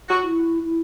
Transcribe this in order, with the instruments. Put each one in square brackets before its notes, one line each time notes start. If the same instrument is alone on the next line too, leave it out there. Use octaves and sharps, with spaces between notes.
[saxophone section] F#4
[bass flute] E4
E4